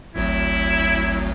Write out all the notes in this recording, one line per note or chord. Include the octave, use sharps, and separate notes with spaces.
G#1 D2 F#3 E4